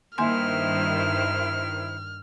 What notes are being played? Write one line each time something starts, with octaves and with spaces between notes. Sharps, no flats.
G2 D#3 A#3 E4 C5 G#5 C6 F6